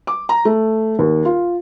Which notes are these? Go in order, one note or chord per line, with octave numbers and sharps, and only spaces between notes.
D6
A#5
A3
D#2
F4